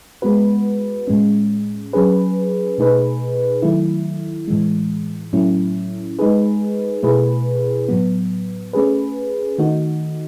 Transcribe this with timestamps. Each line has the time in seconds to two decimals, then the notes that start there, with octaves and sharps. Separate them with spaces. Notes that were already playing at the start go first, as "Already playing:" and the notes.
0.22 G#3 B3 F#4 B4
1.07 A2 G#3 C#4
1.93 F#3 C#4 G#4 B4
2.78 B2 A3 D#4 G#4 B4
3.62 D#3 F#3 A3 E4
4.48 A2 E3 G#3
5.33 A2 F#3 A3 C#4 E4
6.19 G#3 D#4 G#4 B4
7.03 B2 A3 E4 G#4 B4
7.89 A2 F#3 B3
8.73 A3 C#4 G#4 B4
9.59 D#3 A3 D#4 F#4